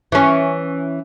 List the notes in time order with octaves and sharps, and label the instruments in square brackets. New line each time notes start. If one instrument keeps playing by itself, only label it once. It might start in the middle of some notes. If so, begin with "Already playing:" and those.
[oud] E3 C#4